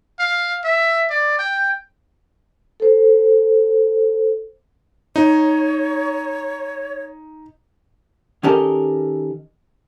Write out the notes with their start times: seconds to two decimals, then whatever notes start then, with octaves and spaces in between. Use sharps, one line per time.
0.19 F5
0.64 E5
1.10 D5
1.39 G5
2.80 A4 C5
5.16 D#4 C#5
8.43 D#3 C#4 G4 A4 A#4 D#5